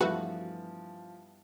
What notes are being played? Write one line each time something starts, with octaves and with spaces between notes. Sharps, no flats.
G2 E3 F3 A3 B3 F#4 B4